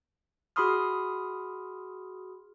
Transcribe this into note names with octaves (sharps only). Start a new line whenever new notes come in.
F#4 G#4 B5 C6 D#6 F6